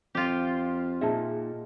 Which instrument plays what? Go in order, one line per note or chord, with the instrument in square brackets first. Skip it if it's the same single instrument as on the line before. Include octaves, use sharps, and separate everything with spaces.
[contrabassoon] F2 [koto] F4 G4
[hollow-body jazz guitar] A#2 D#4 E5 [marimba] G#4 A5